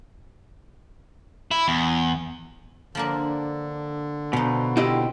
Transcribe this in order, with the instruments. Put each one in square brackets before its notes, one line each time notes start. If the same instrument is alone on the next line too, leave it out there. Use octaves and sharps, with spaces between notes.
[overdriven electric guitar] E4
E2
[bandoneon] D3 [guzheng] F3 A#3 D4
[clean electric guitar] B2 [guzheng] F3 D#4
[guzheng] C4 [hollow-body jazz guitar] E4 G4 D#5